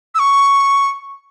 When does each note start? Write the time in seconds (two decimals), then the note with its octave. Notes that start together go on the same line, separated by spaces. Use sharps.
0.15 E6
0.19 C#6